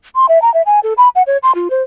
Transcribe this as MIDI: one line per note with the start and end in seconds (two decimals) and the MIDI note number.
0.15 0.26 84
0.29 0.41 76
0.42 0.52 82
0.54 0.62 76
0.66 0.80 80
0.83 0.93 69
0.97 1.09 83
1.15 1.23 78
1.27 1.37 73
1.43 1.55 84
1.55 1.68 65
1.70 1.82 72